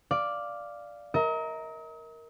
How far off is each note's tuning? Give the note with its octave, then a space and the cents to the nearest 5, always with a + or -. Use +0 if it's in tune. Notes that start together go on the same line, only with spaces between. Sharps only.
D5 +0 F5 -5
A#4 +0 D#5 +45